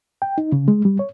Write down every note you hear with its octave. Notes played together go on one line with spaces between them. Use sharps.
G5
D#4
C#3
G#3
G3
C#5